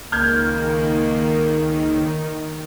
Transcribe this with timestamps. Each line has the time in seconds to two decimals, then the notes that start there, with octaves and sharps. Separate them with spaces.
0.12 C#2 D#3 A#3 F6 G6 G#6